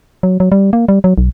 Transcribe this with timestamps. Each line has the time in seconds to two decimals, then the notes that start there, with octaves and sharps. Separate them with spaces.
0.23 F#3
0.40 F#3
0.52 G3
0.73 A#3
0.88 G3
1.04 F#3
1.18 B1